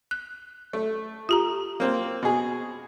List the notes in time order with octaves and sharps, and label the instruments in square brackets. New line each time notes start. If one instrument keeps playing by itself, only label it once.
[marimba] F#6
[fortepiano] A3
[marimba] F4 G4 A#5
[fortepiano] A#3 C4
B2 G#4